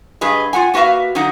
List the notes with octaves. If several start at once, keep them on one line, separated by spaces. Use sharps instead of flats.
G2 G#4 B4 D#5
F4 G4 F#5 G#5
A#3 F#4 B4 E5 F5
D3 F#3 D#4 F#5